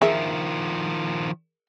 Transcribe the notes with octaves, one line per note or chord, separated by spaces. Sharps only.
D#3 F3 G#4 A#4 E5